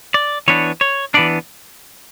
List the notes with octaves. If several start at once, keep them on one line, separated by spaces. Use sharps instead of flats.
D5
E3 B3 D4 C#5
C#5
E3 B3 D4 D5